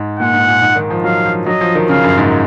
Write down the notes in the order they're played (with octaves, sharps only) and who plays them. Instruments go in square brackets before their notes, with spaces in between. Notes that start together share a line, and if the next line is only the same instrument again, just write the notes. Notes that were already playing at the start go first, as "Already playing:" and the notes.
Already playing: [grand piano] G#2
[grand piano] A#2 [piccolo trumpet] F#5
[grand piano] G#2
A#2
G#2
D#3
F3
[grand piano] F#3 [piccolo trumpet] F5
[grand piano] F3
[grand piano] F#3 [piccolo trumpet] D#5
[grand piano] F3
D#3
[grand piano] C#3 [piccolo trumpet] F5
[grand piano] F#2
G#2